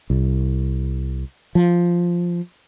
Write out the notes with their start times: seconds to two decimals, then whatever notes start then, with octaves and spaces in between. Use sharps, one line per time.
0.10 C2
1.55 F3